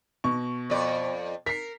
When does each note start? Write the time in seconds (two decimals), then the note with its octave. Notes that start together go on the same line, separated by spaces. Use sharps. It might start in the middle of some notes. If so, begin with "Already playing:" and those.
0.24 B2 C#6
0.70 F2 D5
1.46 A#4 B6 C7